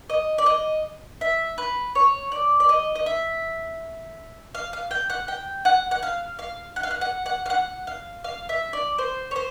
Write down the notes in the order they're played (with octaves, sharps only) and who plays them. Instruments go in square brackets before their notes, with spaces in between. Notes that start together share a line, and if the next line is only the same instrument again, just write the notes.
[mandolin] D#5
D5
D#5
E5
B4
C#5
D5
D5
D#5
D#5
E5
F5
F5
G5
F#5
G5
F#5
F#5
F5
F5
F#5
F5
F#5
F#5
F#5
F5
F#5
F5
F5
E5
D5
C5
C#5
C5